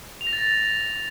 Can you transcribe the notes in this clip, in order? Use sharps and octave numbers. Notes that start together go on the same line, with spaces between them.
F7
A#6
A6